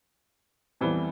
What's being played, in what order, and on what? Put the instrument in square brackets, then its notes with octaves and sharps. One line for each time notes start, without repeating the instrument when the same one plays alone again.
[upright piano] F2 E3 G3 B3